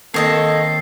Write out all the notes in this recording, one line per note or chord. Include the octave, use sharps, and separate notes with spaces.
D#3 A#3 C4 A4 C#5 D#5 A5 C7